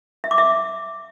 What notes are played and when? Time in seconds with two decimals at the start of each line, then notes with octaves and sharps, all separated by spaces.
0.24 E5
0.31 D6
0.38 E5